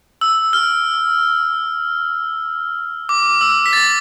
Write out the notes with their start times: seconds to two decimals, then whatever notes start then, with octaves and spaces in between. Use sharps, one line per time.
0.21 E6
0.53 F6
3.09 D6
3.41 E6
3.66 B6
3.73 A6